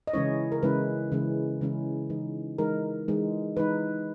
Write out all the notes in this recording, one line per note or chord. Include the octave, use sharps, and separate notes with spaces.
D#5
C#3 E3 G#3 C#4 E4 C#5
A#4
C#3 E3 G#3 C#4 E4 B4
C#3 E3 G#3 C#4 E4
C#3 E3 G#3 C#4 E4
E3 G#3 D#4
E3 G#3 D#4 A#4
E3 G#3 D#4
E3 G#3 D#4 B4